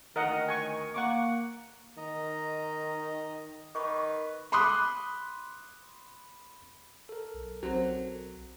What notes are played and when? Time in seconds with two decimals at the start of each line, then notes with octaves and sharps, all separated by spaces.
0.16 D2 D#3 A#4 D#5 F#5
0.49 G#5 C#6
0.94 A#3 F#5 C#6 D6
1.98 D#3 D#5 A#5
3.75 D#3 B4 B5 C#6 D6
4.52 B5 C6 D6 D#6 F#6
7.09 A4 A#4
7.34 B1
7.63 B1 F#3 C4